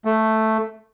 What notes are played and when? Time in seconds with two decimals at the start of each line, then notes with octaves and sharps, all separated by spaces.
0.05 A3